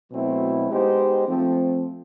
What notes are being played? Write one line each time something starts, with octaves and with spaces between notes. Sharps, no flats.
B2 F#3 A3 C4 E4
G#3 B3 D#4 G4 C5
F3 A3 C4